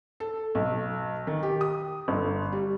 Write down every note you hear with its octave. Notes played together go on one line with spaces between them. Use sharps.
A4
B1
D#3
G4
D#6
G1
G3